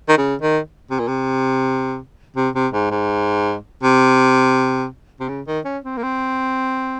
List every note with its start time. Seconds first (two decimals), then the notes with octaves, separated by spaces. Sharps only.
0.09 D#3
0.18 C#3
0.42 D#3
0.91 C3
1.00 A#2
1.08 C3
2.36 C3
2.55 C3
2.74 G#2
2.91 G#2
3.83 C3
5.20 C3
5.29 C#3
5.47 D#3
5.65 C#4
5.85 C4
5.97 A#3
6.03 C4